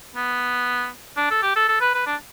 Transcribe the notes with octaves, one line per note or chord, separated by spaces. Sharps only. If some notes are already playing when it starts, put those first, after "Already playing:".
B3
D4
A4
G4
A4
A4
B4
B4
D4